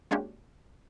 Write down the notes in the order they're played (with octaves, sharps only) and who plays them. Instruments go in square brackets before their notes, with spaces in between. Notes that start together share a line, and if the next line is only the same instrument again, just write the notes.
[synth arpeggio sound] G#3 A#3 C#4 D4 F#4 G4